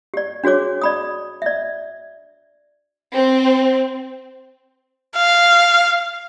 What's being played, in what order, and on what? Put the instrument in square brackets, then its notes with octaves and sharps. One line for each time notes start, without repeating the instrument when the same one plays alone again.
[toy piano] G4 D5
D4 F#4 G#4 C#5 D6
D5 B5 D#6
D5 E5
[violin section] C4
[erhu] F5